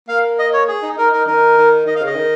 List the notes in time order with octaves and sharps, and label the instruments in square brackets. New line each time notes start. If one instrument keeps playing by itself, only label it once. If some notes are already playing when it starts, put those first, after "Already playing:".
[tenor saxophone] A#3 [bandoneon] F5
[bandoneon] D#5
C#5
G#4
[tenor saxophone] D#4
[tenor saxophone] D#4 [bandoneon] A#4
[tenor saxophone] D#4 [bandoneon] A#4
[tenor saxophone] D#3 [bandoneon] A#4
[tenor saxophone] D#3
[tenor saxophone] D#3 [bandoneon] D#5
[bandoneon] F5
[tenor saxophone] C#3
[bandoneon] D#5
[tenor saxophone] D#3